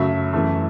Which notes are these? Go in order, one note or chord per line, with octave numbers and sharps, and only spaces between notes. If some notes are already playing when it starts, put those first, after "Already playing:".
Already playing: F#2 C#3 F#3 A3 E5
F#2 E3 A3